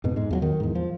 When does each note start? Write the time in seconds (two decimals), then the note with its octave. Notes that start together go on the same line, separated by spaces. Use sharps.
0.04 F2 G#2 B2
0.16 G#2 G#3
0.31 E2 F3 F#3
0.42 D#3
0.60 E2 G#2
0.75 F3